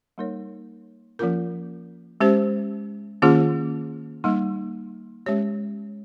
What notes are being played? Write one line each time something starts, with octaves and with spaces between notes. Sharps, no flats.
G3 A#3 D#4 A#4 C#5
F3 A#3 C#4 F4 A#4
G#3 C#4 G4 C5
D#3 A#3 C#4 F4 G#4
G3 A#3 D#4
G#3 C#4 G4 C#5